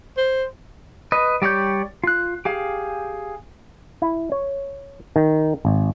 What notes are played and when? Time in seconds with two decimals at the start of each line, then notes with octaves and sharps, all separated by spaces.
0.17 C5
1.12 B4 D#5
1.42 G3 G4 C#5 D5 G6
2.04 F4 F#6
2.45 G4 G#4 F5
4.02 E4
4.32 C#5
5.16 D#3
5.65 G#1